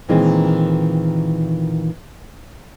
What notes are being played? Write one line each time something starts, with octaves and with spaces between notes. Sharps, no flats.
A#2 D#3 E3 G#3 C4